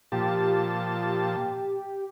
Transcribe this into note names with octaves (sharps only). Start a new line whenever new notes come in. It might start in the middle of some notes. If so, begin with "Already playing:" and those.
A#2 F3 G4 A5